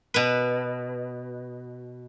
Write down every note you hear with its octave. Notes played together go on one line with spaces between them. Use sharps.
B2 B4